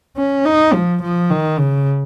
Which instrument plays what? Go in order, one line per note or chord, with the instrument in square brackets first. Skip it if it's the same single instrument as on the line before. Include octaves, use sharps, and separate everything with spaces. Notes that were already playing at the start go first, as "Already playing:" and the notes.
[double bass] C#4
D#4
F3
F3
D#3
C#3